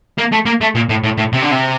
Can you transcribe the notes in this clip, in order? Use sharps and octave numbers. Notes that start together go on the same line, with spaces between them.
A#3
A3
A#3
A3
A#2
A2
A2
A2
C3
D3
C3